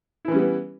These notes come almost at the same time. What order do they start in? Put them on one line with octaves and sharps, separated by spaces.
E4 E3 C#4 G3 B3